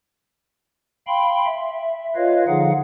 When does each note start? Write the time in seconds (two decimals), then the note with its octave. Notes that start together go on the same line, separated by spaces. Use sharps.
1.07 F5 G5 B5 C6
1.45 E5
2.16 F4 B4 C#5 D#5 F5
2.48 D3 F3 D#4 G#4 F5 F#5